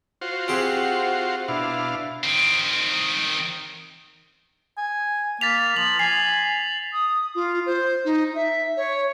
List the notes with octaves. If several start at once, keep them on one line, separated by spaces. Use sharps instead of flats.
F4 F#4 C5
C4 G4 G#4 F#5
B2 D4 E4 F5
D#3 C4
G#5
A#3 A6 B6 F7
F3 F#7
G#5 C7
D#6
F4
C5
D#4
E5
C#5